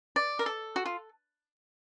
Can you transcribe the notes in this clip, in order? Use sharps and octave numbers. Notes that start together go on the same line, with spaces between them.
D5
A#4
A4
F#4
F4